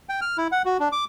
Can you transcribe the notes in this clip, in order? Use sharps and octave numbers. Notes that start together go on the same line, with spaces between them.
G5
F6
E4
F#5
F#4
D4
D6